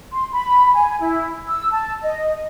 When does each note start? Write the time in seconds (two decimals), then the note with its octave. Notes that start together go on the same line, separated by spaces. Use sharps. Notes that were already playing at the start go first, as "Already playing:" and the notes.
0.12 C6
0.32 B5
0.74 G#5
1.00 E4
1.48 E6
1.71 A5
2.02 D#5